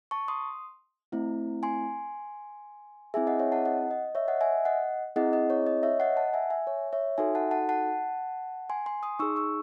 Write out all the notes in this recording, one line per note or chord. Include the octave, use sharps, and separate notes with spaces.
A5 C#6
C6 D#6
A3 C4 E4
G#5 C6
C4 E4 G#4 E5 G#5
D#5 F#5
C#5 E5
F#5 A5
D#5 F#5
D#5
C#5 E5
D#5 F#5
E5 G#5
D#5 F#5
C4 E4 G#4 D#5 F#5
D#5
C#5
D#5
C#5 E5
D#5 F#5
F#5 A5
E5 G#5
E5 G#5
C#5
C#5 E5
D#4 F#4 A4 E5 G#5
F#5 A5
F#5 A5
F#5 A5
G#5 C6
G#5 C6
C6 D#6
D#4 G#4 C#6 E6
C#6 E6